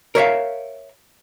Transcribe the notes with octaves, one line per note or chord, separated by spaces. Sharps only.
A#4 C#5 E5 F5